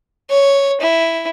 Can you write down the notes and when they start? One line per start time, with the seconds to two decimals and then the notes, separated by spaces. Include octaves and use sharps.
0.29 C#5
0.80 E4